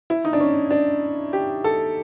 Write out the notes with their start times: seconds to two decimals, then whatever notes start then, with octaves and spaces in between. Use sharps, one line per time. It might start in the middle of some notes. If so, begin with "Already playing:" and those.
0.10 E4
0.25 D#4
0.33 D4
0.40 C#4
0.71 D4
1.33 G4
1.64 A4